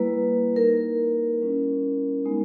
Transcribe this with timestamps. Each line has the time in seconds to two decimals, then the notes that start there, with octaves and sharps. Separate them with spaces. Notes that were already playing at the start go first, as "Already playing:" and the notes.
Already playing: G3 A#3 E4 B4
0.56 A#3 D#4 A#4
1.41 G3 C#4 E4
2.25 G#3 B3 D#4